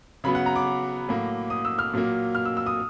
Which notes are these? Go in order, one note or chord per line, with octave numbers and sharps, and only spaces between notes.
C#3 F#3 B3 B5
F#5
A#5
D6
A2 F#3 A#3
D#6
E6
F6
A#2 F#3 A#3
F6
E6
E6
D#6